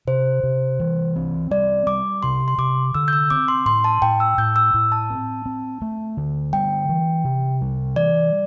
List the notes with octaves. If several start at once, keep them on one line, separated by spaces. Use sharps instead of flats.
C3 C5
C3
E3
C4
G3 D5
G3 D6
C3 C6
C6
C3 D6
D3 E6
G6
E6
C4 D6
C6
A2 C6
A5
A2 G5
E6
A2 G6
E6
A2
A5
C4
C4
A3
D3
G3 G5
E3
C3
G3
E3 D5